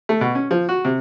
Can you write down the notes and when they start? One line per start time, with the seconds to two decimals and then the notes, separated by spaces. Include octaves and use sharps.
0.09 A3
0.21 B2
0.35 C#4
0.51 F3
0.69 F#4
0.85 C3